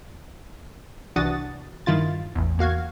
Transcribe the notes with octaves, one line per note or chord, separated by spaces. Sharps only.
C2 E3 D4 F#4 D#6 A6
G2 D#3 E4 F4 A6
A1 E2
E2 A#3 F#4 F5 G#6